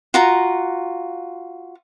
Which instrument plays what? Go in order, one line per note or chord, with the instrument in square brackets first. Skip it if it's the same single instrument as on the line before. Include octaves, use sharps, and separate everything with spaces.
[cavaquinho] F4 F#4 A#5